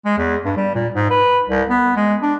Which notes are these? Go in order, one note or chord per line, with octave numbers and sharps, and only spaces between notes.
G#3
E2
G2
G3
A#2
G#2
B4
C2
B3
G#3
D4